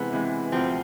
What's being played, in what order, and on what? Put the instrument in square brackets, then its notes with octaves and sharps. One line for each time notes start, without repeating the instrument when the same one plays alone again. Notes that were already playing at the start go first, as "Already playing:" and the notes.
Already playing: [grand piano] C3 E3 G#3 [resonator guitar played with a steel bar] B3
[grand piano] C3 E3 G#3
[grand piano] D2 C3 F3 [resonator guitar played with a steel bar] C4